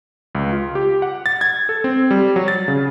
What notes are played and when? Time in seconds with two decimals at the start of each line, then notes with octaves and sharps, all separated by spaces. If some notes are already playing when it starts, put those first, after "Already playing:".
0.35 C#2
0.53 F4
0.75 G4
1.02 F#5
1.26 A6
1.41 G#6
1.69 A4
1.84 C4
2.11 G3
2.36 F#3
2.48 A6
2.68 C#3